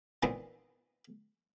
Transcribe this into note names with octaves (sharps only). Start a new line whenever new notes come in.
A#2 D#3 E3 B3 C4